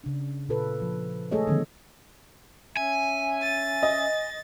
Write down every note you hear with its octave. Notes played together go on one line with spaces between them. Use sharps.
C#3 D4
A#2 F4 A4 B4
F3
G#3 A3 G#4 A4 C#5 D#5
D3 D#3 F3 B3 C#4
C#4 E5 G#5
A6
D#5